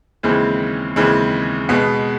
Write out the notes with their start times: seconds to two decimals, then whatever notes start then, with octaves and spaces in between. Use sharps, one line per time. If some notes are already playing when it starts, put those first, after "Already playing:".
0.23 D#2 C#3 E3 G#3 C4
0.96 D#2 C#3 E3 G#3 C4
1.69 B2 G#3 B3